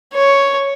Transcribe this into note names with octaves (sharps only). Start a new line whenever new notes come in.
C#5